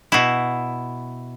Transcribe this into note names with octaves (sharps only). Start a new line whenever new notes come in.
B2 E4